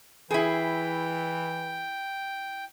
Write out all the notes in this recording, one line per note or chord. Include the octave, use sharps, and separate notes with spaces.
E3 E4 G#4 G5